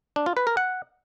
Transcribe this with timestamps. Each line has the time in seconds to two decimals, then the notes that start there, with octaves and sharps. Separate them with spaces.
0.16 D4
0.26 F4
0.37 B4
0.47 A#4
0.57 F#5